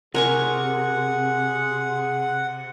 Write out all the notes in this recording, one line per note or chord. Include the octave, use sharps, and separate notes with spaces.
C3 G#4 A#4 F#5 G#5 C#6